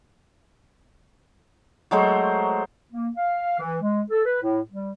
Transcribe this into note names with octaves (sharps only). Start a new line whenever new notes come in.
F#3 G#3 A3 C5
A#3
F5
E3
G#3
A4
B4
A2
G3